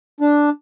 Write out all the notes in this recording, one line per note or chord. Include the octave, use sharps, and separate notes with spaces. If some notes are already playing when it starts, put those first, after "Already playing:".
D4